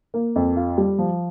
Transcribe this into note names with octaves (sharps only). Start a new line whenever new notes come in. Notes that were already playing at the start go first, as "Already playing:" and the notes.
A#3
F2
F4
G3
F3